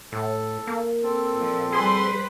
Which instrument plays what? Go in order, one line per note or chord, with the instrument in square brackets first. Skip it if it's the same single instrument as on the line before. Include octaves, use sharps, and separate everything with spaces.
[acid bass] A2 [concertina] A4
[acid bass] A#3
[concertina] C4 A4
[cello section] A#2 F3
[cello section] G3 B4 C5 [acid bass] G#4 [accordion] C6